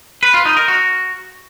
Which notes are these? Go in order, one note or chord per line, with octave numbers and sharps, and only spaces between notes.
B4
F4
D#4
A#4
F#4